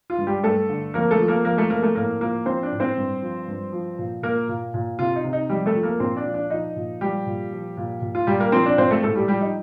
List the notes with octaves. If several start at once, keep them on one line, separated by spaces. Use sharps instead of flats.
F4
G2
G3 G4
G2 A3 A4
D3
F2 A#3 A#4
A3 A4
F3
A#3 A#4
F2 A#3 A#4
A3 A4
F2 A#3 A#4
A3 A4
A2 A#3 A#4
F3 A#3 A#4
F3 C4 C5
D4 D5
A2
C4 C5
G2
F3
G2
F3
A#2
A#2 A#3 A#4
A#2
A#2
C3 F4
D#4
C3
D#4
F2 G3 G4
A3 A4
F3
A#3 A#4
A#2 C4 C5
D4 D5
F3
D4 D5
F3 D#4 D#5
A#2
F3 G3 G4
A#2
F3
A#2
A#2
F4
A#2 G3 G4
A#3 A#4
F3 C4 C5
D4 D5
A#2 C4 C5
A3 A4
A2 A3 A4
G3 G4
F3 G3 G4
D#4